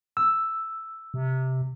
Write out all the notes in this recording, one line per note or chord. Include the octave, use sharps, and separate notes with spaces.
E6
C3